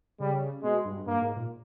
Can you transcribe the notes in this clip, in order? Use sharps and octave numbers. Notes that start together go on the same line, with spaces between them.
C#3 G3
B2 G#3
G2
G2 A#3
G#2
A#2